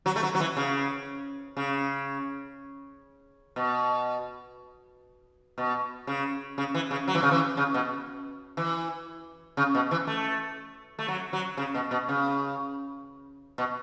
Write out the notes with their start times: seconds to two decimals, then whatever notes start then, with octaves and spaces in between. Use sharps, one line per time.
0.06 F#3
0.16 A3
0.23 F#3
0.35 F#3
0.40 E3
0.57 C#3
1.57 C#3
3.56 B2
5.58 B2
6.07 C#3
6.58 C#3
6.75 E3
6.91 C#3
7.08 F#3
7.15 E3
7.22 C#3
7.31 E3
7.57 C#3
7.74 B2
8.57 E3
9.57 C#3
9.75 B2
9.91 E3
10.07 A3
10.99 A3
11.08 F#3
11.33 F#3
11.57 C#3
11.75 B2
11.91 B2
12.09 C#3
13.58 B2